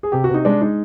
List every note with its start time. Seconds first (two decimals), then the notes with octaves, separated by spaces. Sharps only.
0.03 G#4
0.12 C3 G4
0.24 F#4
0.30 C3 D#4
0.45 G#3 D4
0.61 G#3 D#4